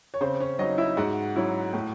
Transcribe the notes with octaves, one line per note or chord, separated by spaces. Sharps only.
C#5
C#3 C4 C5
C#4 C#5
F#3 C#4 D#4 D#5
E4 E5
G#2 F#4 F#5
F#3 C#4 E4
A2